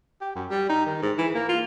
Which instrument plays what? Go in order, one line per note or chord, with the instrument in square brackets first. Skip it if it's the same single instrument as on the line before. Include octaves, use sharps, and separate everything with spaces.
[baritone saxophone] G4
F#2
G3
D#4
D#3
G#2
E3
A#3
F4